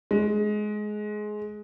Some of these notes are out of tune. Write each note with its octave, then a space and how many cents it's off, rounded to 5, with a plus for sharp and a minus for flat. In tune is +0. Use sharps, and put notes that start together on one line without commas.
G#3 +15